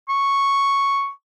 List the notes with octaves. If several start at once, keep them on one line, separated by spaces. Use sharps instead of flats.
C#6